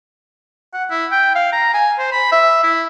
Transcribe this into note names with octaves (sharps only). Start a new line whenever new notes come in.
F#5
E4
G5
F5
A#5
G#5
C5
B5
E5
E4